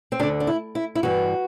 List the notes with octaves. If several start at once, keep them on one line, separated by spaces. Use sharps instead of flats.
C4
D2 D3 D4
D4
E4
E4
E4
G2 E3 F#4